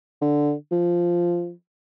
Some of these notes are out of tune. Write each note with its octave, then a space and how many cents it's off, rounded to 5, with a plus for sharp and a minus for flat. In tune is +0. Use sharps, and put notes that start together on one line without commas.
D3 +0
F3 -5